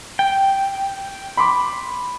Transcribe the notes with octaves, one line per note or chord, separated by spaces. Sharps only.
G5
B5 C6 D6